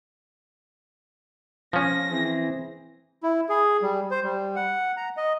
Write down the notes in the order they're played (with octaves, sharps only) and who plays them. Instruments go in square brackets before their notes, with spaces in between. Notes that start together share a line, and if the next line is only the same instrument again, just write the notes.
[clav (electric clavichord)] F3 C#4 [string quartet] A#6
[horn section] E3 C4 G#4
[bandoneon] E4
G#4
G3
C5
G3
F#5
A#5
D#5